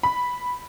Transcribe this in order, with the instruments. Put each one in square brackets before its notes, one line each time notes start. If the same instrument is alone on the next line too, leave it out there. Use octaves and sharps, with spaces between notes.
[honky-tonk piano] B5